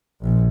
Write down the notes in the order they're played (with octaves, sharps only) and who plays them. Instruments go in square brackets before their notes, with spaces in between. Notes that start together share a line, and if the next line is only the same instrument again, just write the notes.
[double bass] A#1